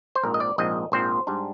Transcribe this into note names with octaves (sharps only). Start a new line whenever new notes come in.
C5
A#1 G#2 F3 C4 A#4
D#5
D5
A#1 G#2 F3 C4 D#5
A#1 G#2 F3 C4 C5
G#2 G3 D4